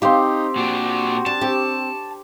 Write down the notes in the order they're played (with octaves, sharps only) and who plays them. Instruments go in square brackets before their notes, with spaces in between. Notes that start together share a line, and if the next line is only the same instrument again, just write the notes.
[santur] C4 G4 [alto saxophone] D#4 [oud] C5 F5
[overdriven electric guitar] A#2 D4 [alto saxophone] F#4
[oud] D4 [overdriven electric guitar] A5
[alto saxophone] C4 [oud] G4 [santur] C#6 D6